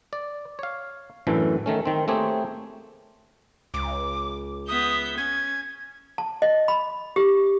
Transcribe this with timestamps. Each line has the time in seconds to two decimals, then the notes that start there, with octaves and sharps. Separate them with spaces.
0.13 D5
0.59 C#5 F5
1.27 F#2 A2 D3 E3 A3
1.66 D#3 A3 C#4
1.85 D#3 C4
2.08 A3 A#3 C4 G4 G#4 C#5
3.74 C#2 D6
4.68 B3 E5 D#6 G6
5.18 C#4 G#6
6.18 A5
6.42 D#5
6.68 B5
7.16 G4